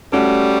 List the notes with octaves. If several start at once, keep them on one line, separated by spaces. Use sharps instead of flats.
G3 A3 C#4 F#4